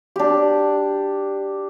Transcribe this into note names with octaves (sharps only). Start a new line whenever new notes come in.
D4 G4